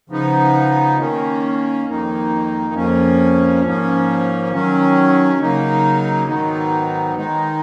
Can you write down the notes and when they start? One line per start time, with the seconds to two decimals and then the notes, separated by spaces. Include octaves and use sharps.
0.10 C#3 F3 B3 D#4
0.98 D#3 A#3 C#4
1.86 F2 D#3 A#3 D#4
2.74 F2 F3 A#3 C#4
3.62 G#2 F3 A#3 C#4
4.50 D#3 F#3 C#4
5.39 C#3 F#3 A#3 D#4
6.27 G#2 D#3 F#3 B3 D#4
7.15 D#3 G#3 D#4